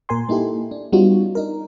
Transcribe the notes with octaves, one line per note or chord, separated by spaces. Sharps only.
A#2 A#4 G#5 C6
A#3 D#4 E4 G4 A4
D4
G3 B3 C#4 D#4 F4 F#4
D4 D#4 A#4